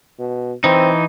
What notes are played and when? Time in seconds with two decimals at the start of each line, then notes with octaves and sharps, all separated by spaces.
0.19 B2
0.64 E3 C4 D#4